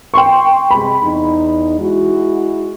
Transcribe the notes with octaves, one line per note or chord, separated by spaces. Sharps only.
G5 C6 C#6
C3 G#3 B5
E2 D#4
G#3 E4 F#4